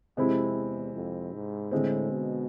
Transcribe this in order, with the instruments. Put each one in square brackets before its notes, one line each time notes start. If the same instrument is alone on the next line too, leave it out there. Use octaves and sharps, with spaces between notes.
[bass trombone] F2 [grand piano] C3 G#3 C4 E4
[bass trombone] E2
F2
G#2
[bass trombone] A2 [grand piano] D3 G#3 C4
[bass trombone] B2